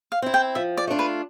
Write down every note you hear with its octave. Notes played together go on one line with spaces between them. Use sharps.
F5
C4 E4
G5
F3 E5
D5
A3 D4 F4
B4